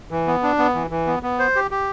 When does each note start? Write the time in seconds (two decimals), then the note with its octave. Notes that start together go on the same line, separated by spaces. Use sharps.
0.11 E3
0.27 B3
0.43 D4
0.58 B3
0.74 E3
0.91 E3
1.07 B3
1.23 B3
1.39 C5
1.55 G4
1.71 G4